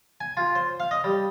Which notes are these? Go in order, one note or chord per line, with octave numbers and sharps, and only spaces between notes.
G#5
F4
C5
F5
D#5
G3